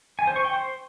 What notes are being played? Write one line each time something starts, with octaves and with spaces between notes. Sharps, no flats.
G#5
C5
C#6
G5
C5